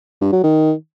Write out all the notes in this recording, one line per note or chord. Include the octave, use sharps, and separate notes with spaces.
G2
F#3
D#3